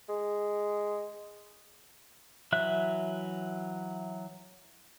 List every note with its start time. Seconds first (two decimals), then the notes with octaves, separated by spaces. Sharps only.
0.09 G#3
2.52 E3 F#3 E5 F#6